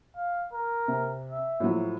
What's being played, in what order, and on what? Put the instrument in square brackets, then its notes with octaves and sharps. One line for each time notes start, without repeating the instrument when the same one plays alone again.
[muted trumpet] F5
A#4
[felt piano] C3
[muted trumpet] E5
[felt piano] A2 F3 F#3